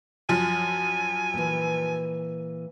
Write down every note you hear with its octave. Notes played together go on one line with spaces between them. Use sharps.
F#2 F3 G#5
A#2 E3